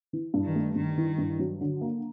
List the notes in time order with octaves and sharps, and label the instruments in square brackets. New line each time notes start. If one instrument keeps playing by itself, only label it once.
[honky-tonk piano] E3
G2
[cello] D#3
[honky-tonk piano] A3
[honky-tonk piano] G2 [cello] D#3
[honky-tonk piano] E3
G2
F#3
D3
A#3